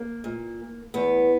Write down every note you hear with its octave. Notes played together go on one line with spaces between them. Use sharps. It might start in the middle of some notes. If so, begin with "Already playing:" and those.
Already playing: A#3
A#2
E2 B3